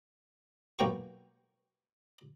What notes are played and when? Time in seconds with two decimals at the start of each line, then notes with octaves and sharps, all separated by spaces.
0.79 B1 A#3 G5 C#6